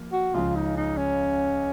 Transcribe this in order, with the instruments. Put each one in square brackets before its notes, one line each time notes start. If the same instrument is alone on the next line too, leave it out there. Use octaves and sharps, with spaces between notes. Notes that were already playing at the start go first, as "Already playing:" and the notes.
Already playing: [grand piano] F3 A#3
[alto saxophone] F#4
[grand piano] C#2 C#3 F3 [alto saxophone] F4
[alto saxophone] D#4
D#4
C#4